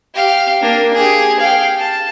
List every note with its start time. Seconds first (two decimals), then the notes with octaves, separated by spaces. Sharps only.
0.15 G4 F5
0.62 A#3 D4
0.94 G4 G#4
1.40 F5 G5
1.79 A5